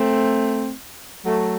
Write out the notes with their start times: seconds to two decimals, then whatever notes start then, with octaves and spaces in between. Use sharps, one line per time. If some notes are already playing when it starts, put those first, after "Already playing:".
Already playing: A3 C4
1.25 F#3 A3